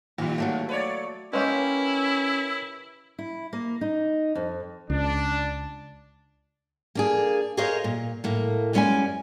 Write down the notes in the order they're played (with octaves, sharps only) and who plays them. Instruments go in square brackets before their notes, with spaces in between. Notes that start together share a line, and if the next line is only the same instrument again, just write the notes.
[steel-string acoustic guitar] A#2 [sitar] D#3 G3
[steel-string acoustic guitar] F#3 A3 A#3
[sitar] B4 C#5 D5
[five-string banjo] G#3 A#3 G4 [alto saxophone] C#4 [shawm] E4 [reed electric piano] B4 C#5
[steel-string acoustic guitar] E4
A#3
D#4
F2
[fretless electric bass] C#2 [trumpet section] D4
[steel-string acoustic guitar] A#3 D4 G#4
G#4 A#4 C5 C#5 D#5 F5
A#2
A2 A#3
F#2 G#3 C#4 B4 D5 G#5